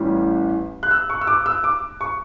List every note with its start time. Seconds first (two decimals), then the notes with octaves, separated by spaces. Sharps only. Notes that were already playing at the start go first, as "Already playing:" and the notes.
Already playing: A1 A2 E3 G3 C#4
0.83 F#6
0.91 E6
1.10 C#6
1.21 E6
1.27 D6
1.46 E6
1.64 D6
2.01 C#6